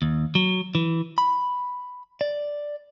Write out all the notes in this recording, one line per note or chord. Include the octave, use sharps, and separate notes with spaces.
D#2
F#3
E3
B5
D5